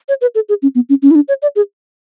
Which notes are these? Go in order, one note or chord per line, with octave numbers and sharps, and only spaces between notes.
C#5
B4
A4
G#4
C#4
B3
C#4
C#4
E4
D4
C#5
D5
G#4